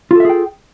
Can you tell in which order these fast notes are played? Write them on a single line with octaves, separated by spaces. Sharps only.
F4 A4 E5 G#4 G5